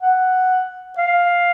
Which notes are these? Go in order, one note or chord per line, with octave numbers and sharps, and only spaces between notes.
F#5
F5